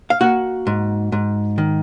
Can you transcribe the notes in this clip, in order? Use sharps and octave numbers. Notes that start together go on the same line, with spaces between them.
F5
A#3 F#4 F#5
G#2
G#2
D#3